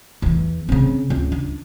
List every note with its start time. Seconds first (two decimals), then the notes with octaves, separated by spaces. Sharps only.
0.22 E2 E3
0.69 C#3 C4
1.10 C#2
1.32 D4